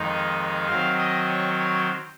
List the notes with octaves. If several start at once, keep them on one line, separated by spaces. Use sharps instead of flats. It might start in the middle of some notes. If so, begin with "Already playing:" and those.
Already playing: F2 D#3 G#3 D#4
D#3 F#3 C4 F5
D#5
C#5
C#5